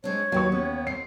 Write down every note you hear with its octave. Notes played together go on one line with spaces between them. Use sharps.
G#3 C4 D4 C#5
D#2 F#3 B4 C#6
B3 C#4
C4 C7